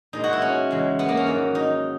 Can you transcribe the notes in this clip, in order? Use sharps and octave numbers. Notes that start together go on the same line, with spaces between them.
A#2 G#3 D#4
F#4
E4
C#4
E2 C#3 G#3
B3
A#3
C#4
G#2 D#3 F#3
D#4